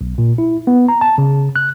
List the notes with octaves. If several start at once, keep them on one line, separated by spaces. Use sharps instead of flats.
B1
A#2
E4
B3
A#5
A5
C#3
F#6